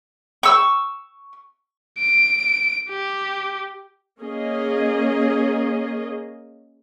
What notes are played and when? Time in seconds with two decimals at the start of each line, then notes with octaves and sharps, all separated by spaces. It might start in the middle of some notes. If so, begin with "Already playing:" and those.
0.43 C#6 E6
1.99 D7
2.90 G4
4.20 A#3 C#4 G#4 D#5